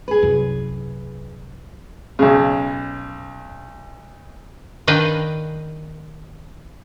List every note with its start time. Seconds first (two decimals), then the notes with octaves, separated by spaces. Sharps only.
0.08 G#4 B4
0.23 C2 F#2
2.19 B1 C#3
4.87 D#3 D4 B4 D#5 F5 G5